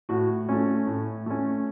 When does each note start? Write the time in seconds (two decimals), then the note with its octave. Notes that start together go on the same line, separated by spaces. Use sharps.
0.09 A2 F#4
0.49 A3 C#4
0.87 A2
1.26 A3 C#4